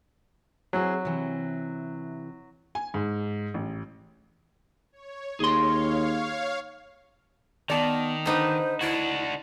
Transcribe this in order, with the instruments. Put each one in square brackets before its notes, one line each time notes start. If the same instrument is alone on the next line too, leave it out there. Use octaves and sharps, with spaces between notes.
[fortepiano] F#3 [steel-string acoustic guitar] C4 E4 G#4
[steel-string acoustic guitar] C3 E3
[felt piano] G#5
G#2
A1
[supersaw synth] C#5
[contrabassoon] D#2 [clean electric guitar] G#4 C6 [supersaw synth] C#5 F5
[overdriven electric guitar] D#3 [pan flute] B3 [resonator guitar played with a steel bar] D5 A5
[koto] D3 D#4 B4 [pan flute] C5
[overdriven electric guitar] D4 F#4 [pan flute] E4